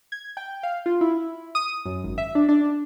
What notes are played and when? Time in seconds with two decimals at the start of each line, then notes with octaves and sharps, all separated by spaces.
0.12 G#6
0.37 G5
0.63 F5
0.86 F4
1.01 E4
1.55 D#6
1.85 F#2
2.04 G#1
2.18 E5
2.35 D4
2.49 D4